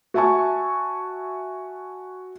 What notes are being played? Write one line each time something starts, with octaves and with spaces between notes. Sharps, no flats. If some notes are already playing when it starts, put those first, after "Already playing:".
F#4 E5 G#5 A5 C#6